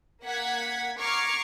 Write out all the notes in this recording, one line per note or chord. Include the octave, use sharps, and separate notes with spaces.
A#3 F#5 G#6 B6
A#5 C#6 D6 F6 G#6 C7